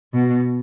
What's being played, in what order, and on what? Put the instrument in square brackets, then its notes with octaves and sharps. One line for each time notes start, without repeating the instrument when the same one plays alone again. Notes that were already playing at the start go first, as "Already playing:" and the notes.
[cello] B2